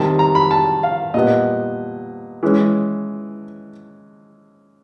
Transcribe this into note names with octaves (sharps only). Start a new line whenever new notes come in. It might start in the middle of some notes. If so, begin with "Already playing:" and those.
Already playing: C3 D#3 G3 A5
A#5
B5
A5
F5
A#2 G3 B3 D#5
E3 G#3 C#4